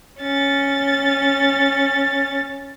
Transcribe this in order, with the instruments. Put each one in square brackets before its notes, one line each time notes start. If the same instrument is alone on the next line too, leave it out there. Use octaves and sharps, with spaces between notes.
[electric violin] C#4 A6